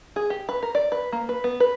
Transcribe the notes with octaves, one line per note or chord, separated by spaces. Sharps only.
G#4
G4
B4
A#4
D5
B4
A#3
B4
B3
B4